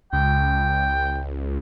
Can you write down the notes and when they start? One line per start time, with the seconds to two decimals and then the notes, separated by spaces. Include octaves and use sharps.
0.13 C#2 G5